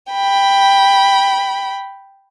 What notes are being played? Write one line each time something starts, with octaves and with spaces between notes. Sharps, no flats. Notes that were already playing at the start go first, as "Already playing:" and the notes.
G5 B5